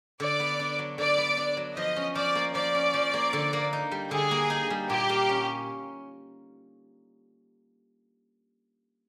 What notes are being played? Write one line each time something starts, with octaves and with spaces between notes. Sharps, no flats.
D3 D5
B3
D4
F#3
D3 D5
B3
D4
F#3
F3 D#5
C#4
F3 D5
A#3
F3 D5
C#4
F3
A#3
D3
A#3
D#4
G3
D3 G#4
A#3
D#4
G3
A#2 G4
A#3
C#4